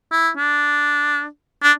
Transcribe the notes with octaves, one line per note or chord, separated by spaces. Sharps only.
E4
D4
D4